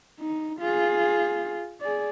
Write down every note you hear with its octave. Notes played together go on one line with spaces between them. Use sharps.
D#4
F4 G#4
G#4 D5